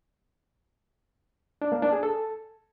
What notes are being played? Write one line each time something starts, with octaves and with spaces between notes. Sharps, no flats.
D4
A#3
D4
G#4
A4